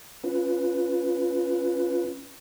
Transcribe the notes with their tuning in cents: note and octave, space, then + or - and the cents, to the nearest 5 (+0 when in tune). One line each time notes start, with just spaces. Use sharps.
C#4 +0 F4 +0 B4 +0